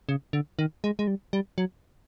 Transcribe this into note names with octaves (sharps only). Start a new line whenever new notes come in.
C#3
D3
D#3
G#3
G#3
G3
G3
F#3